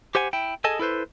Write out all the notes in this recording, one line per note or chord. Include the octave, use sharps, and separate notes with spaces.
G4 C5 F#5 G#5
E4 G5
G#4 A4 D#5 G#5 A5
E4 A4 B4 C5